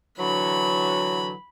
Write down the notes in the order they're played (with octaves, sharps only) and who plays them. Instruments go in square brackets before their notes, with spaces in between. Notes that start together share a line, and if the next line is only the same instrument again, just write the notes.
[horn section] D3 E3 F#3 [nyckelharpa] B5